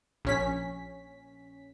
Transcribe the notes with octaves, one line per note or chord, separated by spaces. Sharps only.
A#1 C#4 B6